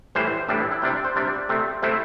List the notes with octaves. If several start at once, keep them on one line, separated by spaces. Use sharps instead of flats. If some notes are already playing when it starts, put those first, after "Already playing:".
A2 E3 G3 C5
A2 E3 G3 D4
E4
E4
C3 G3 D4 G5
C5
C3 G3 D4 D5
C3 A3 C4
C3 A3 C4 E4